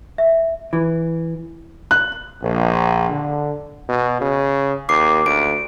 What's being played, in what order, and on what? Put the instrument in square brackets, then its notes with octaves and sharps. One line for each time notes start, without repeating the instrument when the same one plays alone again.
[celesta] E5
[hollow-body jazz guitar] E3
[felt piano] F#6
[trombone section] A#1
D3
[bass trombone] B2
C#3
[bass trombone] D#2 [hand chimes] D6 C7
[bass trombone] D2 [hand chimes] D7